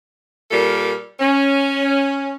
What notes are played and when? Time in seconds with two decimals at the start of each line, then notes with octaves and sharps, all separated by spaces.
0.51 A#2 G3 A4 A#4
1.20 C#4